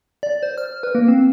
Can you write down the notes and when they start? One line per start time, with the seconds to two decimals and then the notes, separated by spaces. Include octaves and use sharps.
0.23 D5
0.43 C5
0.58 F6
0.83 B4
0.95 A#3
1.08 C4